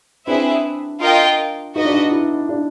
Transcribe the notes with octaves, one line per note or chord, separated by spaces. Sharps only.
C4 D4 E4 G#4 B4 E5
F4 A#4 D#5 G5
D#4 F#4 B4 D#5
D4
D#4
E4
D4